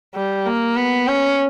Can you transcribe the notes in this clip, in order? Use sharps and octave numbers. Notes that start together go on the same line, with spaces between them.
G3
A#3
B3
C#4